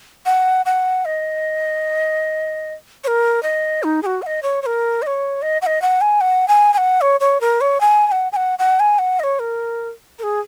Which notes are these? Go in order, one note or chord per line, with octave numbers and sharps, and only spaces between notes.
F#5
F#5
D#5
C#5
A#4
D#5
D#4
G#4
F#4
F#5
D#5
C#5
C#5
A#4
D#5
C#5
D#5
F#5
D#5
F#5
G#5
F#5
G#5
G#5
F#5
C#5
C#5
A#4
C#5
G#5
G#5
F#5
G#5
F#5
F#5
G#5
F#5
D#5
C#5
A#4
A#4
G#4